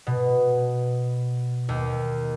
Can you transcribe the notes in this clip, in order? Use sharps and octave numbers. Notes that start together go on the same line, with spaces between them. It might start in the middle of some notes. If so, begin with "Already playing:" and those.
B2
D#2